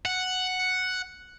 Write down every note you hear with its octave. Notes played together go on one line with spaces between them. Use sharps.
F#5